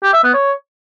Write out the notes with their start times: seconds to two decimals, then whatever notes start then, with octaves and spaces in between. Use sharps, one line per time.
0.03 G4
0.13 E5
0.23 B3
0.34 C#5